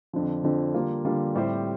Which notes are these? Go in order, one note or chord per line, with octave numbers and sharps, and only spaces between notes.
F2 D3 F3
F2 D3 F3
D3 G3 A#3 F4
D3 G3 A#3 F4
A2 G3 C4 G4 C5